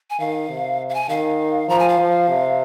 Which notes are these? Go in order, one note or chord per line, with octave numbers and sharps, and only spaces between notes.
G#5
D#3 F5
C3
F5
G#5
D#3 F5
F3 A#5
G#5
F5
F3
C3